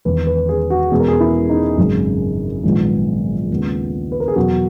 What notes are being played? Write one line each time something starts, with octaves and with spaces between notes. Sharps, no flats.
E1 E2 D#3 B4
B4
G#4
F#4
E2 B2 G#3 B3 G#4
A#4
G#4
E4
D#4
G#1 F#2 C#3
A#1 G#2 D#3 G#3 B3
D#2 C#3 G#3 B3
B4
A#4
G#4
E2 B2 F#3 F#4